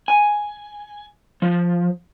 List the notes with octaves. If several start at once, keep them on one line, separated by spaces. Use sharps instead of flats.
G#5
F3